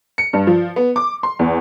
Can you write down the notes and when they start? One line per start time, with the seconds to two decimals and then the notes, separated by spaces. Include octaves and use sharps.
0.18 C#7
0.33 G2
0.47 F3
0.76 B3
0.96 D6
1.23 C6
1.39 E2